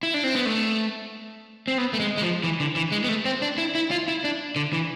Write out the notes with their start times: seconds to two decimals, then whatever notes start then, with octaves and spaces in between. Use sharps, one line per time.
0.03 E4
0.14 D4
0.24 C4
0.35 B3
0.46 A3
1.68 C4
1.78 B3
1.93 A3
2.00 G#3
2.17 G#3
2.22 F3
2.43 E3
2.60 D3
2.76 E3
2.92 G#3
3.04 B3
3.09 A3
3.25 C4
3.42 D4
3.58 E4
3.75 E4
3.91 F4
4.08 E4
4.24 D4
4.56 D3
4.73 E3